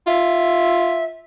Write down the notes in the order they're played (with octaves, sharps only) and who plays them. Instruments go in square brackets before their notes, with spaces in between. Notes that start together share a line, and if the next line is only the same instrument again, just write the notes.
[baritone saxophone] F4 [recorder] E5